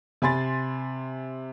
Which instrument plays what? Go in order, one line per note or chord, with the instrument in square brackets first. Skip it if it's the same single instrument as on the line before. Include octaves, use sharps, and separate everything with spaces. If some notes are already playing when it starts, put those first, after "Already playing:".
[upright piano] C3 G#5 B5 C6 A6